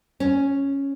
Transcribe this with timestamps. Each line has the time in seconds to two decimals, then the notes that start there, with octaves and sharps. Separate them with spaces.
0.20 C#4